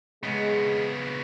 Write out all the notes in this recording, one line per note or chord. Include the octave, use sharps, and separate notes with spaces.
C#3 G#3 B3